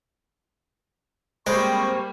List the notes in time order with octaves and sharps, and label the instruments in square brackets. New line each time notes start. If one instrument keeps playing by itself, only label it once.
[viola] G3 A#3 [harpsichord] G#3 [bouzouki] C4 [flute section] B5 C#6